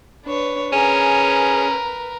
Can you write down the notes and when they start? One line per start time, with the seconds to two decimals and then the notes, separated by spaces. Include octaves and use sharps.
0.24 D4 B4 C#5
0.73 C#4 G#4 A#4 B4